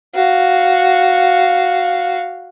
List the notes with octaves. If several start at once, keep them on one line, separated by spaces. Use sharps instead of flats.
F#4 F5